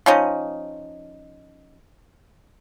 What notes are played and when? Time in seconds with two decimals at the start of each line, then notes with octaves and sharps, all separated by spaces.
0.06 F3 C#4 D#4